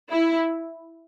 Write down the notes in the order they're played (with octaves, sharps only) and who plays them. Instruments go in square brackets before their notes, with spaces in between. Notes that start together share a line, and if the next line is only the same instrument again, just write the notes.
[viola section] E4